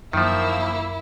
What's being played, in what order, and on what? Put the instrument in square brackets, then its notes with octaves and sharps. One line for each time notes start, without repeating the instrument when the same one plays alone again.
[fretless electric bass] F#2 [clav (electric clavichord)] D#3 F3 [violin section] A#3 E6 [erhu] E4